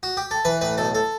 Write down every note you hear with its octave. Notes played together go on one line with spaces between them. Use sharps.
F#4
G4
A4
E3 B4
A2 B4
B1 A4
A4